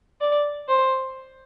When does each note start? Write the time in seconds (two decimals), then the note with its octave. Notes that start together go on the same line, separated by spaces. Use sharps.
0.21 D5
0.69 C5